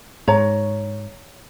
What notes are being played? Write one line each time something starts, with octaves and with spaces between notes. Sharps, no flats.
G#2 C#5 A#5